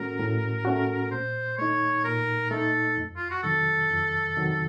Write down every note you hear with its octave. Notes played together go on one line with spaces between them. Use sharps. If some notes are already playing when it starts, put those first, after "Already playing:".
Already playing: A2 A3 C#4 F#4 A#4
A2
A3 C#4 F#4
A#4
A#2 C5
A3 D#4 C#5
A#2 A#4
A3 D#4 A4
F2
F4
F#4
C3 D#3 F#3 A4
F2
C3 D#3 F#3